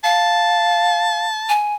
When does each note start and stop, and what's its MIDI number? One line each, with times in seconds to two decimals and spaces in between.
0.04 1.27 77
0.04 1.52 81
1.49 1.75 80